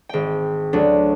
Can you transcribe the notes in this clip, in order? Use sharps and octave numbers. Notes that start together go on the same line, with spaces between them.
G#1 G5
D2 F#3 D4